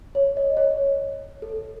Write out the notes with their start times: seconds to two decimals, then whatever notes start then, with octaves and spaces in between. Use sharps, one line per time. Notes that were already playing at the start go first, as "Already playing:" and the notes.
0.15 C#5
0.37 D#5
0.57 C#5
1.42 A4